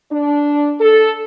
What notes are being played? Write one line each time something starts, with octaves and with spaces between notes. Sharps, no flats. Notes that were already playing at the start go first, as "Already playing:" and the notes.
D4
A4